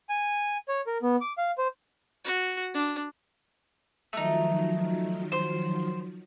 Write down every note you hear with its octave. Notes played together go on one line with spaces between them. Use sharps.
G#5
C#5
A#4
B3
D6
F5
C5
F#4
D4
D#3 F3 F#3 A3 D#4
C5